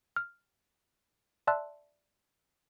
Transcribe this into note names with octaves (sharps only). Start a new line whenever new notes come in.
F6
D5 E5 A5 C6 E6 F#6